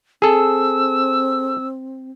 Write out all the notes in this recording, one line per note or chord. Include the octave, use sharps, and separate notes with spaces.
C4 G#4 A4 E6